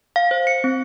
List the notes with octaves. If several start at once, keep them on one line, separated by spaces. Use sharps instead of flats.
F5
C5
C#7
C4